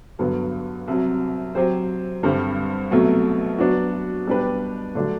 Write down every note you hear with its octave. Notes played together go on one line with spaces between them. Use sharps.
G2 D3 F#3 B3
C2 C3 F#3
F#3 C4 G4 C5
G2 D3 G3 C4
C2 B2 F#3 A3
F#3 B3 D4 F#4
B2 G3 D4 G4 B4
D3 F#3 A3 D4